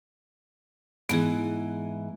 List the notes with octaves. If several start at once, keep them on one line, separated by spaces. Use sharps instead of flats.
G#2 E3 B3 G#4